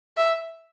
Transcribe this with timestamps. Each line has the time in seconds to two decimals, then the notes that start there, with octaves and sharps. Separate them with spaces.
0.17 E5